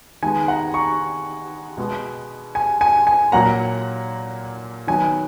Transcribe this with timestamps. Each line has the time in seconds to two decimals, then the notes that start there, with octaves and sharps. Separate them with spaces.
0.22 D#3 G#3 B3 G#5
0.48 F#5 A#5
0.74 A#5 C#6
1.77 B2 G#3 B3
2.55 G#5
2.81 G#5
3.07 G#5
3.32 A#2 F#3 A#3 F#5 A#5
4.87 D#3 F#3 B3 G#5